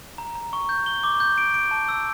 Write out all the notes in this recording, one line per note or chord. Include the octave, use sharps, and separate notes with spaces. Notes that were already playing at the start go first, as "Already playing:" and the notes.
A#5
A#5
C#6
G6
G7
D6
G6
D7
D7
A5
E6